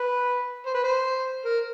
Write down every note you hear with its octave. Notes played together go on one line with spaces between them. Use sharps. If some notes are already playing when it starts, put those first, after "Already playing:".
Already playing: B4
C5
B4
C5
A#4